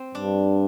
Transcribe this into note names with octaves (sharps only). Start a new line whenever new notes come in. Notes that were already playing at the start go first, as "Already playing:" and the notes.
Already playing: C4
G2 D4